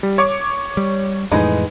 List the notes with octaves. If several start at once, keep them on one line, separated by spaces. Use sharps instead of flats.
G3
C#5 C#6 D6
G3
F2 A2 E3 G#3 B3 D#4